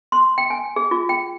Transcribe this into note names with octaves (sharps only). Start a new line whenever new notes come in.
C6
G5
G#5
G#4
F4
G5